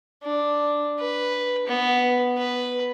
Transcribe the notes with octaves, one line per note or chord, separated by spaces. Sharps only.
D4
B4
B3
B4